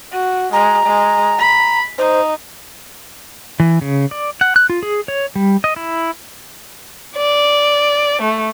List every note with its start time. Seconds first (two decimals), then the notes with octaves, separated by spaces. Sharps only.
0.12 F#4
0.53 G#3 A#5
0.86 G#3
1.39 B5
1.98 D#4 C5
3.60 E3
3.81 C#3
4.11 D5
4.41 F#5
4.56 F#6
4.70 F4
4.83 G#4
5.08 C#5
5.36 G3
5.64 D#5
5.76 E4
7.16 D5
8.22 A3